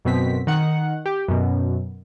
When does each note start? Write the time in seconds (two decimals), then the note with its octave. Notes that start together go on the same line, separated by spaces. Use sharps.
0.05 F#2 B2 C4 B6
0.47 D#3 F#5
1.06 G4
1.28 F#2 B2